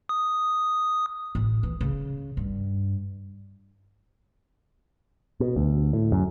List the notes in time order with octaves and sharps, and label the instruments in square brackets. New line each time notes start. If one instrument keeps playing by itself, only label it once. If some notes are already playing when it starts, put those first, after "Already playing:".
[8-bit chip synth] D#6
[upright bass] A1
E3
C#3
G2
[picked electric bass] B2
D2
A2
F#2